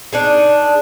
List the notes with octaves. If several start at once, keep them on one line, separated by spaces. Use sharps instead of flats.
D4 D#4 G#4